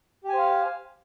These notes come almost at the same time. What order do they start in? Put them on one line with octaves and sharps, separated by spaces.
G4 G#5 C5 F5